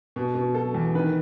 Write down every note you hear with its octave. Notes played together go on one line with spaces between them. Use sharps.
B2
B2
F#3 A4
E2
D#3 B4